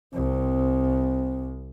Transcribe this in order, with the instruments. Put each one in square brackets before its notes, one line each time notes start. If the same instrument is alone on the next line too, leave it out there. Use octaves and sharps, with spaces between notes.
[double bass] C2 [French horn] C4